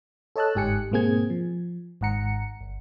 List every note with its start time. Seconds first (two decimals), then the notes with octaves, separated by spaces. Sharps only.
0.36 A4 C#5 D#5 A5 E6 F#6
0.55 G1 G#2 G4 G#5 F#6 C#7
0.92 G#2 B2 A#3 C4 G#4 G#6
1.30 F3
2.01 G#1 G#2 F#5 A#5 C#7
2.61 G1